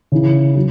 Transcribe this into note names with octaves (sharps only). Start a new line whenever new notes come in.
C#3 E3
F#3